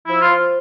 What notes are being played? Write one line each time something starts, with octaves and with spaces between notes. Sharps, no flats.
F3 E4
F4
F3